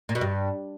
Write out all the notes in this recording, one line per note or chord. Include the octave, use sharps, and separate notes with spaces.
A#2
B2
G2